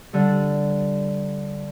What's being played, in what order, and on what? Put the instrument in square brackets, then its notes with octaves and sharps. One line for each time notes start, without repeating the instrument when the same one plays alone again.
[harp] D3 G3